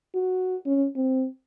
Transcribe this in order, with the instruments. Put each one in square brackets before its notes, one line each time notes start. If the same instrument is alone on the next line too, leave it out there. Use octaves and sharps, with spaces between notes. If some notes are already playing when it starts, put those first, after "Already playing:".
[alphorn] F#4
C#4
C4